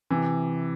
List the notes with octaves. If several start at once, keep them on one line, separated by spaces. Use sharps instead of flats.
C3 E3